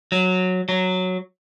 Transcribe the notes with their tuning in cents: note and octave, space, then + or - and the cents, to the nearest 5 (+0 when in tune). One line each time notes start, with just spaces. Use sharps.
F#3 -10
F#3 -5